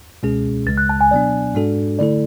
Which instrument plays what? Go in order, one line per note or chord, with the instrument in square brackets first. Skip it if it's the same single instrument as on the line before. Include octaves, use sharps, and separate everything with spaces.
[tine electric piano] C#2 B2 G#3 C#4 G#4
[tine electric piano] C#2 C#3 G#3 [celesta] A6
[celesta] F#6
A5
G#5
[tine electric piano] B2 F#3 B3 D4 [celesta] D5
[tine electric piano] G#2 G#3 D4 F#4 A4
[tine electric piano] D3 A3 E4 A4 [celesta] D5